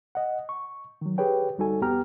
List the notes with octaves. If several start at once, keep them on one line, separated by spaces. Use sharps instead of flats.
D#5 F#5
C#6
D#3 F#3
G4 G#4 B4 C#5 G5
D2 G3 D#4 F#4 A4 G#5
F2 B3 G4 G5 A#5 F6